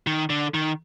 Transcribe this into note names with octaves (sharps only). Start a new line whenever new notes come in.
D#3
D3
D#3